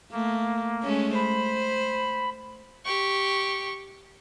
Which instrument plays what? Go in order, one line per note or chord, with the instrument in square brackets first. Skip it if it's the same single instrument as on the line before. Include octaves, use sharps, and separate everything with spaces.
[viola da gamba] A3 [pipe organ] A#3
[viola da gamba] G#3 A3 C#4
[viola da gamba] C5 [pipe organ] B5
[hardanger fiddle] G4 C#6